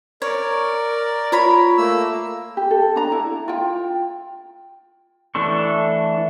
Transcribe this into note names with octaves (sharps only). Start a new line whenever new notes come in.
A#4 C#5 D5
F4 A#4 C#5 B5
A3 A#3 E6
G4
A4
D4 A#5
E4
F4 G5
E3 A3 D4 A4 C#6